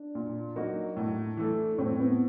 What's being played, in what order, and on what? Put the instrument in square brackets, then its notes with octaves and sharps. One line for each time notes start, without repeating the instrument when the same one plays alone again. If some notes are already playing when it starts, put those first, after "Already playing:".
Already playing: [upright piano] D4
[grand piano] A#2
F#3 A#3 D#4 F#4
A2
E3 A3
[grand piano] A2 [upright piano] C4
[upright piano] B3